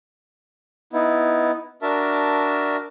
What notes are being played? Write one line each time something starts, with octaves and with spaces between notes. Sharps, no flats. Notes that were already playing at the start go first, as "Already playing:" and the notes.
B3 D#4 E4
D4 F#4 A#4 E5 A5